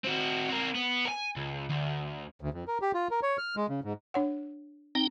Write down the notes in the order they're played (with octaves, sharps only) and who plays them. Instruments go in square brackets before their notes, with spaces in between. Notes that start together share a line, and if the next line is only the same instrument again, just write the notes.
[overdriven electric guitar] C4 F#4
C4 A#4
B3
A#4 G#5
C#2
D2
[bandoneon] D2
F2
A#4
G4
F4
A#4
C#5
F6
G#3
C#3
G#2
[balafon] D4 C#5 F#5
[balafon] C4 [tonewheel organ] D#4 G5